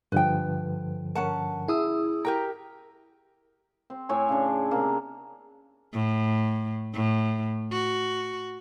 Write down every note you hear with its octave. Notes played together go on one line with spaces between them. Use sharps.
G2 D3 F3 B4 G5
C#4 A#4 F#5 A5
E4 G#4 D#6 E6
G4 A#4 G5 A#5
C4
A2 C#5 G#5
C#3 D4
C3 A#3
A2
A2
F#4